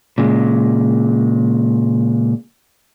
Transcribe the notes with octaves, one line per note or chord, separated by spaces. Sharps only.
A#2 C#3 G#3